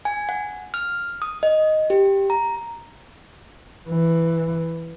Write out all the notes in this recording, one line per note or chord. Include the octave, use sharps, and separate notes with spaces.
G#5
F#5
F6
D#6
D#5
G4
A#5
E3